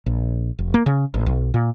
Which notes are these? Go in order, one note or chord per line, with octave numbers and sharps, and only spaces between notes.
A#1
F1
A#3
C#3
A1
B1
A#2